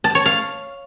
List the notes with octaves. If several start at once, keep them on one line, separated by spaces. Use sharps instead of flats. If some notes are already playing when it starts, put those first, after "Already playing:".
A5
C#5
F5